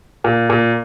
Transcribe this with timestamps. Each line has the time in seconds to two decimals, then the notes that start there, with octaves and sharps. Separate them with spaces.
0.24 A#2
0.50 A#2